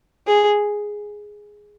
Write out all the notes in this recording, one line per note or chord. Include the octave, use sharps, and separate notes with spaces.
G#4